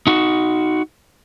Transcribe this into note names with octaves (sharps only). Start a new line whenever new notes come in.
D#4 F#4